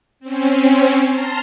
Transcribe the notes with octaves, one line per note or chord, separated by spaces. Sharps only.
C4 C#4
A5 A#5 C6 F6 A6